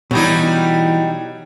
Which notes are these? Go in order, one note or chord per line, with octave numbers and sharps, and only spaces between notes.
B2 E3 F#3 G3 D#4